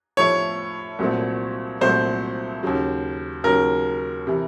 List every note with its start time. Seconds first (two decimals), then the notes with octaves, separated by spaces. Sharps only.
0.17 A2 F3 A3 C#5
0.99 C2 A#2 F#3 A3 C4
1.81 C2 A#2 F#3 A3 C4 C5
2.63 D#2 C#3 F#3
3.44 D#2 C#3 F#3 A#4
4.27 C3 E3